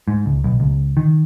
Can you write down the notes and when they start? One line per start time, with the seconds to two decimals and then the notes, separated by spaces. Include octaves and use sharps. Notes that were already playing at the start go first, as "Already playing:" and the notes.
0.08 G#2
0.26 C#2
0.44 B1
0.60 C#2
0.97 D#3